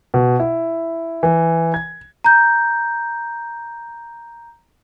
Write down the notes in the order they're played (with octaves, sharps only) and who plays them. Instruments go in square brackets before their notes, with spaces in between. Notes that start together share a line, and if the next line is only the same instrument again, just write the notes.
[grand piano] B2
E4
E3
G#6
[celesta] A#5 G6